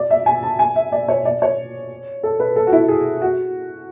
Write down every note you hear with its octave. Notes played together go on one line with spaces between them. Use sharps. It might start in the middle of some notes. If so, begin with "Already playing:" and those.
Already playing: D5
E5
G#5
A5
G#5
E5
D5
C#5
D5
C#5
A4
B4
A4
F#4
E4
G#4
F#4